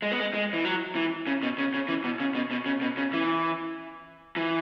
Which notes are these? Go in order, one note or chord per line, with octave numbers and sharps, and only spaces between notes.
G#3
B3
G#3
G#3
E3
F#3
E3
C#3
B2
C#3
C#3
E3
B2
C#3
B2
B2
C#3
B2
C#3
E3
E3